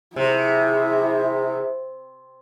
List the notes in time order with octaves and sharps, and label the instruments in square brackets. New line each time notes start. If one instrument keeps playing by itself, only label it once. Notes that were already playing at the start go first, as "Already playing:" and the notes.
[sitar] C3 [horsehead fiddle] E4 G#4